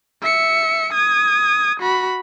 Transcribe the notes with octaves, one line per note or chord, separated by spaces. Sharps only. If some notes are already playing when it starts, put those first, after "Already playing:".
E5 C#7
D#6 G#6
F#4 B5